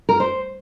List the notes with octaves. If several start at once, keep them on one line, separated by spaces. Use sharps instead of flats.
A#4
C5